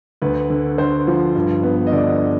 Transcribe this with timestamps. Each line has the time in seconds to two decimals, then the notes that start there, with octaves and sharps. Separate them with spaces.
0.22 D2 B4
0.50 D3
0.78 D3 C5
1.08 F3
1.35 G2
1.63 B3
1.87 D#5
1.92 D3 D5